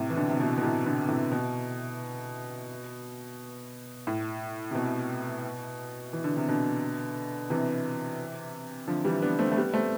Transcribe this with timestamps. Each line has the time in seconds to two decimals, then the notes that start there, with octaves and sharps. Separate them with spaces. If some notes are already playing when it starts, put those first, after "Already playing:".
Already playing: A2 C3
0.10 E3
0.16 B2 D3
0.29 C3
0.40 B2
0.57 B2
0.63 A2 C3
0.85 B2 D3
1.08 A2 C3
1.32 B2
4.07 A2
4.71 C3
4.75 B2
6.13 E3
6.24 D3
6.37 C3
6.48 B2 D3
7.50 C3 E3
8.88 D3 F3
9.05 E3 G3
9.22 B3 D4
9.39 A3 C4
9.51 A3
9.56 G3 B3
9.73 A3 C4